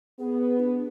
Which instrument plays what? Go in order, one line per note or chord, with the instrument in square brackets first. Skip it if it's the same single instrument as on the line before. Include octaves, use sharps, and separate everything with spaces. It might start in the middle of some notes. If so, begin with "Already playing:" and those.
[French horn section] B3 [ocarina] G#4
[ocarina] D4